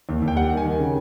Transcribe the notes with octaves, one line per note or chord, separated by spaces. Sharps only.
D#2
D#2
G5
G3 F#5
D#3
G#5
D#3
C#3